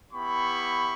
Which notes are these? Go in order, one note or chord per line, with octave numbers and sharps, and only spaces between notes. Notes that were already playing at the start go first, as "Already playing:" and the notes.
B3 E4 G4 B5 C#6